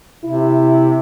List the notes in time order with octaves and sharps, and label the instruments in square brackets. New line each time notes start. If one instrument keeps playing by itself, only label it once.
[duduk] C3 [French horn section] E4